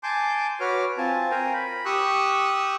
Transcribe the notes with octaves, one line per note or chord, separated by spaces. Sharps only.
G#5 A5 C6 D6 G6
F#4 B4 C#5 D6 F6
C4 F4 G#5 A5
A#4 C5 G5 G#5 A#5
B5
G4 C#6 D#6 E6 F#6